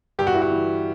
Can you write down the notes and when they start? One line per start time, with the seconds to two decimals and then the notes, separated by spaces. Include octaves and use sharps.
0.19 G2 G4
0.27 F#4
0.34 E4
0.42 F#4
0.52 E3